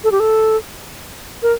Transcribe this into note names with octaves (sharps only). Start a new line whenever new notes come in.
A4
G4
A4
A#4